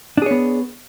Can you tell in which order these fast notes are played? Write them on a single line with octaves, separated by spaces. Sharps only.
D4 G#4 C#5 B3